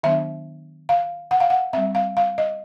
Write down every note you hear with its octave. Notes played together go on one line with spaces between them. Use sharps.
D#3 F#3 B3 D4 E5
F5
F#5
F5
F#5
G3 C4 E5
F5
F5
D#5